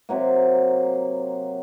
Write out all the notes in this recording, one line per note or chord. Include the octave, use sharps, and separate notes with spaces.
C3 F#3 A#3